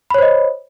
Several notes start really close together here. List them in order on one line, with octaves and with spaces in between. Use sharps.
B5 C#5 C5 D#5